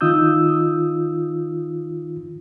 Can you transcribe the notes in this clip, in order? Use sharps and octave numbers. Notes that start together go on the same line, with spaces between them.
D#3 D#4 F4 D#6 E6 G6